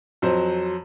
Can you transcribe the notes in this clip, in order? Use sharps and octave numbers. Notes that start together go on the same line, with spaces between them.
F2 F#3 C5